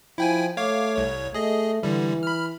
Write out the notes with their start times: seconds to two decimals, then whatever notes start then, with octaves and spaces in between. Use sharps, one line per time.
0.18 F3 E4 G5 G#5
0.57 A3 C#5 F5 D6
0.95 C2 C#5
1.34 A3 G#4 D#5
1.83 D3 E3 G3
2.23 B5 F6